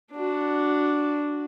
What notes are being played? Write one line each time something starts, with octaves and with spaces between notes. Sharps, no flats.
D4 F#4